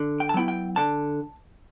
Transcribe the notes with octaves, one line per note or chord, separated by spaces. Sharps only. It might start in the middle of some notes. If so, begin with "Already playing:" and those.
Already playing: D3
G5
A5
F#3 B3 E4 G5
G5
D3 A5